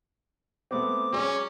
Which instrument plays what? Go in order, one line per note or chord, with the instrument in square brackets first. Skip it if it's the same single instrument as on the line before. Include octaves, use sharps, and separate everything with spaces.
[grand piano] A3 B3 C4 [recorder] D6
[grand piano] F#3 G#3 D5 [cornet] C#4